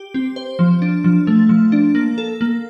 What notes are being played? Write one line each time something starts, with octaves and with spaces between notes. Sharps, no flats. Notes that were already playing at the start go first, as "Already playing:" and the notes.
Already playing: G4
C4
C5
F3
D4
F3
A3
F3
D4
A#3
A4
A#3